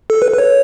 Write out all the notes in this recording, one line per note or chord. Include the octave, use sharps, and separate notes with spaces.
A4
B4
B4
C#5